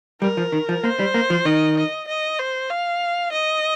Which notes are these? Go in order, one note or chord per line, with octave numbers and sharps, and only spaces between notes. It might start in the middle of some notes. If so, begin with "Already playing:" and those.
G3 A#4
F3
D#3
F3
A#3 C5
G3
A#3
F3
D#3 D#5
D#5
D#5
C5
F5
D#5